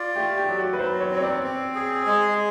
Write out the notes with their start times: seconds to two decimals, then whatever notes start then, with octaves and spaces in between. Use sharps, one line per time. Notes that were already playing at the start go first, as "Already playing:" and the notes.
Already playing: F4 D5
0.16 A3 G4
0.37 G4
0.48 F#3
0.58 F#4
0.73 B4
0.79 F#3 C5
1.01 C#5
1.11 C4
1.18 C#5
1.22 D5
1.43 C4
1.75 G#4
2.06 G#3